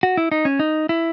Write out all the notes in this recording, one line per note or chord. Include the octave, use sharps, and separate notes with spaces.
F#4
E4
D#4
C#4
D#4
E4